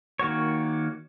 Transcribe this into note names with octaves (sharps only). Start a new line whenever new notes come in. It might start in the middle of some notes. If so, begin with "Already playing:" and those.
D#3 A#3 F#4 C#5